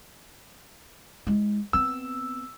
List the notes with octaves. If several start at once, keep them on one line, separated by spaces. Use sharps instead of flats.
G#3 E4
B3 C4 E6